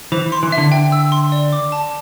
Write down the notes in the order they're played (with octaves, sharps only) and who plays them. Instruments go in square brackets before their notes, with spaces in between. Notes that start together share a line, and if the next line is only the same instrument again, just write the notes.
[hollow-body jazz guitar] E3 [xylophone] C5
[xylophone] C6
[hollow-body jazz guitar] E3
[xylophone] E5
[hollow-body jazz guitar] D3
[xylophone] G5
E6
C6
D5
D6
A5